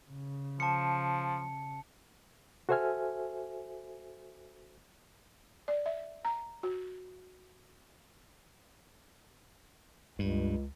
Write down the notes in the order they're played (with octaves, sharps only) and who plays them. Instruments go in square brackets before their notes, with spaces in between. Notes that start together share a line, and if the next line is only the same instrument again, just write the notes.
[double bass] C#3
[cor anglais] F3 [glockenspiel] A5 C#7
[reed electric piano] F#4 A4 C5 E5 G#5 F6
[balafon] D5
E5
A#5
F#4
[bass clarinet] C#2 [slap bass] G2